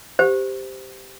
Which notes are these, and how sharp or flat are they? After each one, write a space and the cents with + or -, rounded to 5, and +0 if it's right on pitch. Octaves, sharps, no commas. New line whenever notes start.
G4 +0 C5 -15